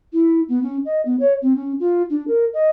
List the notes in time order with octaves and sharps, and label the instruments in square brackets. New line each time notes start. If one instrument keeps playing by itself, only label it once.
[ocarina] E4
B3
C#4
D#5
B3
C#5
C4
C#4
F4
D4
A#4
D#5